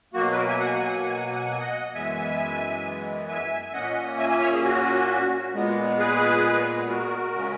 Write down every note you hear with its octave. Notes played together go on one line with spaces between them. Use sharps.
B2 F#3 A#3 F#4
B4
F#4 A#4
E5 G#5
F#5
G#5
F#5
G#5
F#5
G#5
F#5
G#5
F#5
G#5
F#5
G#5
F#5
G#5
D#5 F#5
F#2 E3 G#3 B3 E5 G#5
E5 G#5
E5
A#2 A#3 C#4 D#5 F#5
E5 G#5
E5 G#5
C#5 E5
G#4
F#4
A#2 G#3 B3
G#4 B4
F#4 A#4
C#3 G#3 C#4